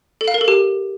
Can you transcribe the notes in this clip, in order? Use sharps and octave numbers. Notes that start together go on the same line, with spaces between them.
A4
F5
A#4
A4
G4